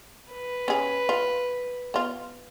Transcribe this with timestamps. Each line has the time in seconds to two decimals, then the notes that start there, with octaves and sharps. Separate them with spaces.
0.32 B4
0.68 C#4 G#4
1.09 F4
1.94 B3 F4